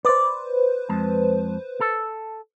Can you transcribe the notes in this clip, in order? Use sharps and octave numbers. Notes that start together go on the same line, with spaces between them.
B4 C5 D5
F2 G#3 A5
A4